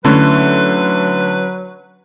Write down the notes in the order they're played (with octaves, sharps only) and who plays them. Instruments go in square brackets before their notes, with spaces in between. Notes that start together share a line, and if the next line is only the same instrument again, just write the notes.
[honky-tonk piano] D3 A3 [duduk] F#3 [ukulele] C#4 E4 C#5 [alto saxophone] B4